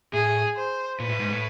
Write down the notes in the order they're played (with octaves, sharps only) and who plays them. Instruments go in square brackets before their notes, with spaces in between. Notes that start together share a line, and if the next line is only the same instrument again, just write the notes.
[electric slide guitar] A2 [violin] G#4
[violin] C5
[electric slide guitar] A#2 [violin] B4
[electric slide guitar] A2
G#2
A2